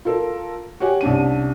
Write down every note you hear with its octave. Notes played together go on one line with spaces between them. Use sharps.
F4 A4 A#4
F#4 G4 C#5 F#5 G#5
C2 C#4 D4 D#7